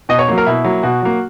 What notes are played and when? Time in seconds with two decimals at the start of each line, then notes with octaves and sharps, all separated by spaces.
0.09 B2 D#5
0.19 C#5
0.28 F#3 A#3
0.38 A#4
0.46 B2 E4
0.64 F#3 A#3
0.83 B2 F#4
1.02 F#3 A#3